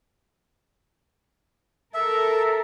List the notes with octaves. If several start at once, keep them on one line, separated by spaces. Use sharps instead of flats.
A4 A#4 E5